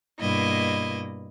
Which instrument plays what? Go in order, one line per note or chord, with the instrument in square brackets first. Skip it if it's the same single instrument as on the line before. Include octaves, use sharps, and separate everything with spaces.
[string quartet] G2 B2 A#3 E4 D#5